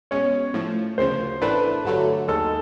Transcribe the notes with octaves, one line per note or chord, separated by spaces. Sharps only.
B2 G#3 C#4 C#5
A2 F3 A3
D2 C#3 F3 C5
A2 E3 A3 D4 B4
G2 D3 F#3 A3
D#2 D#3 G#3 A4